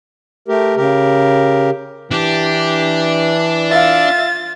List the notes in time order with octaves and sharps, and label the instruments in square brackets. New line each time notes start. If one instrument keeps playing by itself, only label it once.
[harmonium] A3 G4 A#4
C#3 G4 A#4
[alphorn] E3 [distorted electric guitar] D4 [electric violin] G4
[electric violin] F4 A6 [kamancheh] E5 F5